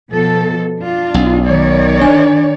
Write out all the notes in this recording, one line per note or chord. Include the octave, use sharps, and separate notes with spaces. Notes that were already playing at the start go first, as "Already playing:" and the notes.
B2 F3 A4
D4 F4
B1
D#3 C#5 D5
D4 G#5